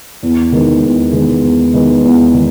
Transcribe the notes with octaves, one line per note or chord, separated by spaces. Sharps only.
E2
D#3 G#3 B3 D#4
E2
D#3 G#3 B3 D#4
E2
D#3 G#3 B3 D#4
E2
D#3 G#3